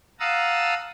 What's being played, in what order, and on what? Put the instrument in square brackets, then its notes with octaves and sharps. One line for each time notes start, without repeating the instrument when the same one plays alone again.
[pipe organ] F5 F#5 A5 A#5 D#6 E6